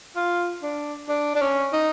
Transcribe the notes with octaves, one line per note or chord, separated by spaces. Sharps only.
F4
D4
D4
D4
C#4
D#4